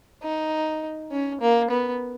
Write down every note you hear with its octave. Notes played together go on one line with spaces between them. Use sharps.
D#4
C#4
A#3
B3